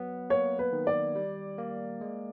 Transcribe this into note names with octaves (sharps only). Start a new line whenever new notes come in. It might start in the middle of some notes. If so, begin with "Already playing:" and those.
Already playing: F#3 B3
A#3 C#5
B4
D#3
D5
G3
A#3
G#3